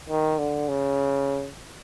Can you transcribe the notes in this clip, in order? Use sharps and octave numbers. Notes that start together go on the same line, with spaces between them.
D#3
D3
C#3